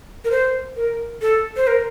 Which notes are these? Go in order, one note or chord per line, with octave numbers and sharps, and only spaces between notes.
A#4
C5
A#4
A4
C5
A#4